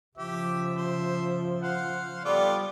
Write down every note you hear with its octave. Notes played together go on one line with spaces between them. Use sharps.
C#3 F3 G4 E5
C5
C5 F5 F#5
G3 B3 F4 A4 D6